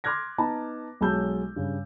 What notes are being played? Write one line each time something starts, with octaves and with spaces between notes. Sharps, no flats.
C6 D6 F6 F#6 G#6 A#6
B3 D#4 A5 A#5
B1 F#3 G#3 A5 E6 G6
G2 C#3